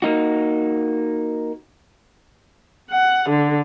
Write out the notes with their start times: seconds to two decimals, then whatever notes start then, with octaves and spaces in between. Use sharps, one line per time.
0.02 A#3 D#4 F#4
2.91 F#5
3.29 D3